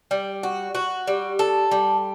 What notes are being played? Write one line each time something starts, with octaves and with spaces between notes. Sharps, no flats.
G3
F#4
F#4
G3
A4
G3